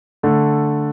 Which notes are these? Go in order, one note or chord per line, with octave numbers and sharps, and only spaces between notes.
D3 A3